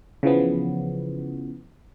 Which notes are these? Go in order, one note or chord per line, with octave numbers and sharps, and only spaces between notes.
C#3 E3 F3 B3